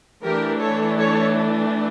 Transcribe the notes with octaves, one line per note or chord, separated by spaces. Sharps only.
E3 A3 D4 G4 A#4
A4 C#5
A4 C#5